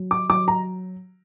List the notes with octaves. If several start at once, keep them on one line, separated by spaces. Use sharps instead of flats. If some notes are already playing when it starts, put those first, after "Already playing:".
Already playing: F#3
D6
F#3 D6
A#5